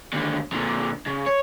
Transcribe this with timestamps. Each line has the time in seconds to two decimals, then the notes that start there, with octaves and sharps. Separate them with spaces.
0.13 D#2 D3
0.52 A#2 D3
1.06 C#3
1.26 C#5